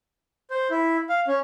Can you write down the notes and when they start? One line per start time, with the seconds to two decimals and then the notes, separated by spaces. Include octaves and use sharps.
0.50 C5
0.71 E4
1.09 F5
1.28 C#4